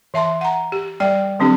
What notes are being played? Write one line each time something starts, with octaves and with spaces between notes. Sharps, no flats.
E3 E5 A5 C6
F#5 A#5
G4
G3 D5 G5
D3 F#3 C4 D4 G4 A4